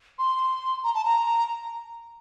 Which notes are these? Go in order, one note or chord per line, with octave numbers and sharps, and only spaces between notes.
C6
A#5
A5
A#5